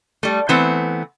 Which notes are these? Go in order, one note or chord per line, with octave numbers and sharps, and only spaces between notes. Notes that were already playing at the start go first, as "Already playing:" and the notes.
G3 A3
E3 A3 B3 C4